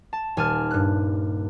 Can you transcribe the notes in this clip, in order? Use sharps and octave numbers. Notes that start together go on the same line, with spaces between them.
A5
D#1 G#5 A5 F6
G2 F#6